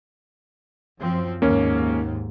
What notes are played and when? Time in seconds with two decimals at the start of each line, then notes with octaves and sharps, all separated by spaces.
1.01 F#2 F3 C4
1.42 D#2 G#2 A#3 C#4